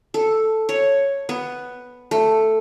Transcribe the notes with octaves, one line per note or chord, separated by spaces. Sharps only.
A4
C#5
B3
A3